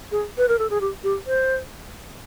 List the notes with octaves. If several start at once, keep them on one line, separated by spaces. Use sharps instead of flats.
G#4
B4
A#4
A4
G#4
G4
G4
C5